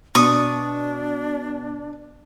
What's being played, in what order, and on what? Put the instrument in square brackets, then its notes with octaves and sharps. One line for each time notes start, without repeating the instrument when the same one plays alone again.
[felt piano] B2 [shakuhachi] D4 [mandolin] C#6 D#6